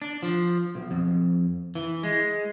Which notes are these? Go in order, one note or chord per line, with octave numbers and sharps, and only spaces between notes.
D4
F3
B1
F2
E3
G#3